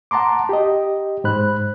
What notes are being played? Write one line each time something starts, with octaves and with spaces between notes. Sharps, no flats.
F#5 A5 A#5 C6 D6
G4 D#5
G#2 C5 B5 F#6